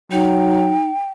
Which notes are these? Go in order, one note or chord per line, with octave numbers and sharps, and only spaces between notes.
F#3 D#4 G5